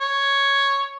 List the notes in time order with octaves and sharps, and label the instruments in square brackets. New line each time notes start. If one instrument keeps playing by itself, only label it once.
[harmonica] C#5